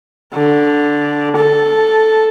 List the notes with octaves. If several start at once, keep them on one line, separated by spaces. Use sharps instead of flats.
D3
A4